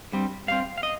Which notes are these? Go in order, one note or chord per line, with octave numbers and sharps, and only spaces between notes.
G2 G3 C4
G2 G3 C4 F5
F5
D#5